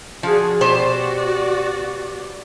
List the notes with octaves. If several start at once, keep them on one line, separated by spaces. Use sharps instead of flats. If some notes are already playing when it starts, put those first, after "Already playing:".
F3 D4 F#4 G#4
B2 F#4 G4 C5 D5